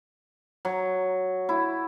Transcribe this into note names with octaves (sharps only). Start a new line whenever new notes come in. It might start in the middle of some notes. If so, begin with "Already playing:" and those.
F#3
E4